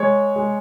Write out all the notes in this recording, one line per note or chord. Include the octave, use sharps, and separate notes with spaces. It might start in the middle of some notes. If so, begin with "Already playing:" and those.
Already playing: G#3 C#5
G#3